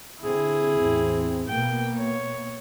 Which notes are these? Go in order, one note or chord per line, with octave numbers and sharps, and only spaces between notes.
D3 C4 E4 G#4
A1 E2 C4
B2 A#3 B3 G5
C#5